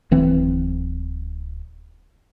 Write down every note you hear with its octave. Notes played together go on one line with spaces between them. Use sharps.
D1 E3 C4